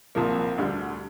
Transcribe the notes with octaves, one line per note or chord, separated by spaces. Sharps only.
C2 A#2 F3 A#3
D2 D3 G3